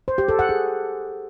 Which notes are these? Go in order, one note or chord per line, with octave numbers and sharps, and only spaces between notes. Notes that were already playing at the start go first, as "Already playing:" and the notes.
C5
G4
A4
F#5
G#4